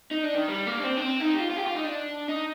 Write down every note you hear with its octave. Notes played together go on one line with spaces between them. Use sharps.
D#4
D4
D#3
G3
A#3
D4
C4
D4
C4
D#4
G4
F4
F4
G4
F4
D#4
D4
D#4